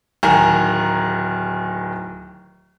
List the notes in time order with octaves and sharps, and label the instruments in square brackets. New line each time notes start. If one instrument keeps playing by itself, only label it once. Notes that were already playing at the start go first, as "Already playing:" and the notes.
[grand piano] D1 D#3 G#5 A#5